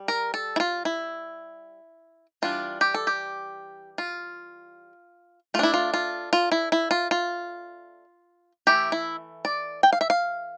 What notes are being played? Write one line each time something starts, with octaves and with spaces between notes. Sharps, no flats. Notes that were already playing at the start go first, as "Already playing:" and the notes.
Already playing: G3
A#4
A4
E4
F4
E4
E3 G3 D4 F4
G4
A4
G4
F4
A3 F4
D4 E4
F4
F4
F4
E4
E4
F4
F4
E3 A3 E4 G4
E4
D5
G5
F5
E5
F5